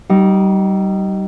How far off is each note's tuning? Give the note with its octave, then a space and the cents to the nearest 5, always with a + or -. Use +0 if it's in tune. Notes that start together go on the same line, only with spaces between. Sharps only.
G3 -25 D#4 +0